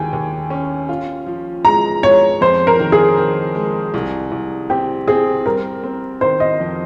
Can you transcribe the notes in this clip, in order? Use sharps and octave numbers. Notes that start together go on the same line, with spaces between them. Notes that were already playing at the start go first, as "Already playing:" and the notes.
Already playing: D#2 G#3 G5 G#5
D#2
C#4
F4
F3
G#3 A#5
G#3 C#5
F2 C5
A#4
D#3
G#4
D#3
G#3
C2
C2
C4 G4
C4 G#4
G3 A#4
C4
D#3 C5
D#5
F2